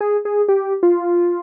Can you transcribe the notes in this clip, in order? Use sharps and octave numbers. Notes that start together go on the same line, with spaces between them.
G#4
G#4
G4
F4